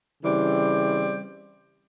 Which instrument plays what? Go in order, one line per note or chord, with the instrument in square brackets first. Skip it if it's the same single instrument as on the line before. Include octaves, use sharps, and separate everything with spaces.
[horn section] C#3 E3 G3 C4